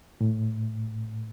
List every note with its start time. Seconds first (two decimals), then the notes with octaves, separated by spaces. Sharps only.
0.21 A2